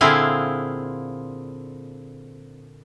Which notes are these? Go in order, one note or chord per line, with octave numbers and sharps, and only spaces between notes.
A#2 D3 C4 E4 G#4 F5